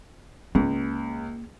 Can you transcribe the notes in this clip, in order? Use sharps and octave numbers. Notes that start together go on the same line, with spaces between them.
C#2 A#3